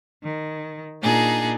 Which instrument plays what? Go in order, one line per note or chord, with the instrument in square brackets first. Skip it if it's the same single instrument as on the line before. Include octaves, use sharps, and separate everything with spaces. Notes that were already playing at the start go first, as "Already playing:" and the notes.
[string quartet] D#3
A#2 D4 D#4 G#4